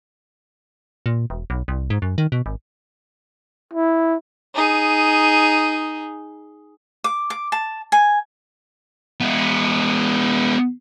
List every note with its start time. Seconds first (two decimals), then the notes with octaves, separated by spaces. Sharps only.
1.06 A#2
1.30 E1
1.50 B1
1.68 C2
1.90 G#2
2.02 F#2
2.18 D#3
2.32 B2
2.46 G#1
3.73 E4
4.55 D#4 G#4
7.04 D6
7.30 D6
7.52 A5
7.92 G#5
9.20 G#3 B3